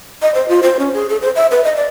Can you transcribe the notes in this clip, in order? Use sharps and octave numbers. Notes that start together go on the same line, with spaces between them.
D#5
C5
F4
C5
C#4
G#4
A4
C5
E5
B4
D#5
D5